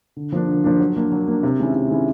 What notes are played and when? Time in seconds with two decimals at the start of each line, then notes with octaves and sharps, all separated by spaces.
0.16 D3
0.32 F3 A#3 D4
0.48 D3
0.64 F3 A#3 D4
0.80 F#3
0.96 A#3 D4
1.12 F#3
1.28 A#3 D4
1.43 C3
1.59 D#3 G#3 C#4 E4
1.74 C3
1.90 D#3 G#3 C#4 E4